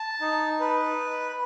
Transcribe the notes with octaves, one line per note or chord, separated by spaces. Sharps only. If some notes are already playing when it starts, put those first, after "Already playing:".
Already playing: A5
D#4
B4